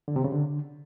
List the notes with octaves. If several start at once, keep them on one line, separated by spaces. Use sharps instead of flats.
D3
C3
C#3
D3